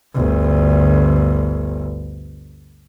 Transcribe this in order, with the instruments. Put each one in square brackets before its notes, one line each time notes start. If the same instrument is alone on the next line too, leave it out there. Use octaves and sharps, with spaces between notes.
[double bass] G1 D2